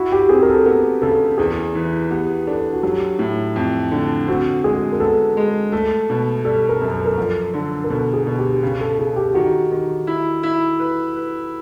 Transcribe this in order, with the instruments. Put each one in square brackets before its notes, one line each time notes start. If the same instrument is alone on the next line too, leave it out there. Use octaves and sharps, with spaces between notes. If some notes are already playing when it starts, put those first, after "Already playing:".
Already playing: [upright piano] E4 [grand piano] F#4
[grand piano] G4
[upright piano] C4 [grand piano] G#4
[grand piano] A#4
A4
[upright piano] B3 [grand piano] A#4
[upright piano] C#3 [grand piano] A4
[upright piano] E2 [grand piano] G#4
[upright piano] E3
[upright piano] B3 [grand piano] G4
[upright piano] D4 [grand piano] A4
[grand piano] F#4
[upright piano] F#3 [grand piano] G4
[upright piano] A2
F2
D3
[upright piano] C4 [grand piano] F#4
[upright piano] G#3 [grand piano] G#4
[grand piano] A#4
[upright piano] B3 [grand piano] A4
[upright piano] G#3
[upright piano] A3 [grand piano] A4
[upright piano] B2
[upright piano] G3 [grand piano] A4
[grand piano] A#4
[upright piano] F#2
[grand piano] A4
A#4
[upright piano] F3 [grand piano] A4
[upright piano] D3
[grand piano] A#4
[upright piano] B2 [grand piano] A4
[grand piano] G#4
[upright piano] B2
[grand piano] G4
[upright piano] C#3
[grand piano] A4
[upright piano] C#3 [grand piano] G#4
[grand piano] G4
[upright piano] D#3 [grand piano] F#4
[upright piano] D#3
E4
E4
B4
B4